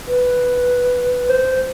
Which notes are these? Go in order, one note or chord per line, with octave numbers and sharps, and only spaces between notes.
B4
C5